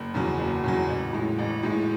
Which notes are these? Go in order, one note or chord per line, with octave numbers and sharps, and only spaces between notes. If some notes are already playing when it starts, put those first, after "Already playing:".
Already playing: F#1
E2 C#3 F#3
F#1
E2 C#3 F#3
A1
A2 G#3
A1
A2 G#3